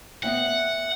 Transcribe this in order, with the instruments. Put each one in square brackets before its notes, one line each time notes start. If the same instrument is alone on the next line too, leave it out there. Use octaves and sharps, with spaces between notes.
[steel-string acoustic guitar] B3 E5 G5 [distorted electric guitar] F#5